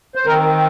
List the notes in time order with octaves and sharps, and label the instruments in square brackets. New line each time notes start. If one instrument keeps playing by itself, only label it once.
[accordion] C5
D#3 C4 A#4